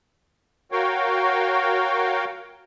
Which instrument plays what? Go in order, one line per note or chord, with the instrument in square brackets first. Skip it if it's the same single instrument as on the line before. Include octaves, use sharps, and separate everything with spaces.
[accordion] F#4 A#4 C#5 F5 G5